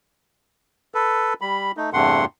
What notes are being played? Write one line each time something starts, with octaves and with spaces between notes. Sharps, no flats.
A4 B4
G3 B5
A3 D#4
E2 G2 C3 A3 F#5 C6